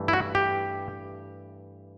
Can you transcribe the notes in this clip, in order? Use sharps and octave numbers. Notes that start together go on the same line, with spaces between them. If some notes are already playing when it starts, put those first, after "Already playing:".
Already playing: G2 E3 A3
E4
F#4
G4